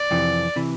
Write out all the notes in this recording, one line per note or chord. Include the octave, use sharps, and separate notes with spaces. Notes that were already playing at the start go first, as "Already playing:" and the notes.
Already playing: D5
F2 C3 E3
C3 E3